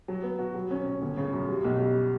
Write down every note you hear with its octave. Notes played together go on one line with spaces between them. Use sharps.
F#3
B3
F#4
F#3
C#4
C#4
G1
C#3
F#2
G3
B1
G3